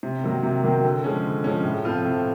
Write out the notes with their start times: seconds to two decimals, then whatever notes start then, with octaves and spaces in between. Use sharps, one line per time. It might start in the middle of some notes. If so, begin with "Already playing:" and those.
0.03 C3
0.23 D#3 F#3 A#3
0.43 C3
0.63 D#3 F#3 A#3
0.84 D3
1.04 F3 G#3 C#4
1.24 D3
1.44 F3 G#3 C#4
1.64 A2
1.85 F3 A3 C4 F4
2.06 A2